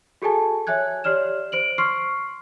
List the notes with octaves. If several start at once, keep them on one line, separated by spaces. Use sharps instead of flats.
F#4 G#4 A4 G#5 A5
C#5 E5 G#5 F#6 G#6
G4 C#5 D5 F6 E7
C5 D7 F#7
C6 C#6 F6 C7